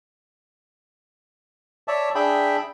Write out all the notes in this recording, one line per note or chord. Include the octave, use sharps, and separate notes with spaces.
C#5 D5 E5 A5
D4 G#4 E5 G5 B5